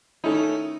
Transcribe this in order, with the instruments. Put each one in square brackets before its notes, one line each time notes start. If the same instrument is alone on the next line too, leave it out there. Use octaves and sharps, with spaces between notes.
[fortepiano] D#3 A3 C#4 E4 [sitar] D#4